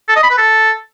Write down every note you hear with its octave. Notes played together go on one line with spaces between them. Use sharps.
A4
D#5
B5
B4
A4